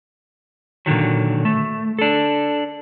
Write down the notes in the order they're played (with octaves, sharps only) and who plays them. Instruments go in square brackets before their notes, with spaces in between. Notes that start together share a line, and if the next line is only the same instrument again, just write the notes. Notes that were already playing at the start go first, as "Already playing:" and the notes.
[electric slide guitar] A#2 D3 D#3 F#3
A3
D4 A4